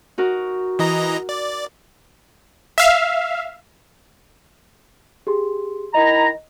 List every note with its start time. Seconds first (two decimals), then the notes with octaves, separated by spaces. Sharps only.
0.18 D#4 F#4 A#4
0.79 E3 D#5 A#5
1.29 D5
2.78 E5 F5
5.27 G4 G#4 C6
5.95 D#3 E4 D#5 A#5